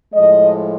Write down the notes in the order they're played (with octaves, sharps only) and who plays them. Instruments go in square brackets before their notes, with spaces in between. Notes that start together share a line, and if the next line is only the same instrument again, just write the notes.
[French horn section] A2 F3 G#3 D#5